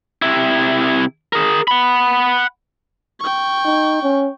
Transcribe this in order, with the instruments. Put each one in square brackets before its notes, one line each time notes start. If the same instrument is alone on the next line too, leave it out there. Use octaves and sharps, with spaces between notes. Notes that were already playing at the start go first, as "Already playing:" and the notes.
[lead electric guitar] C3 E4
G#4 A#4
F#5 B5
[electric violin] G5 C#6
[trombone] D#4
C#4